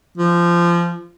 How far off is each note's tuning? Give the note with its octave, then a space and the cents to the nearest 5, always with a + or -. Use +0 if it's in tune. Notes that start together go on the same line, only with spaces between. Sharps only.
F3 -20